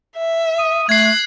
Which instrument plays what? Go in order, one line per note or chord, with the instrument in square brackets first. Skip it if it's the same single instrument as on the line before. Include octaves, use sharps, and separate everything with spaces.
[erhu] E5
[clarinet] D#6
[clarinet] A3 [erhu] F#6 [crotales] G#6 C7